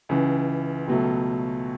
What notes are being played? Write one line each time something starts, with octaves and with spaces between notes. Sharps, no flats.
C#2 C#3 E3
C#2 B2 F#3 A3